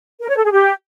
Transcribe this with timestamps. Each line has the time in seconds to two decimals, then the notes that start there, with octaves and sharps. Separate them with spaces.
0.21 A#4
0.29 C#5
0.36 A4
0.44 G#4
0.51 G4